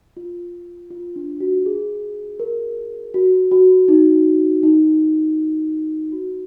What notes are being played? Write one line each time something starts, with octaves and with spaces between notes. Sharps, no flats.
F4
F4
D4
F#4
G#4
A#4
F#4
F#4
D#4
D#4
F#4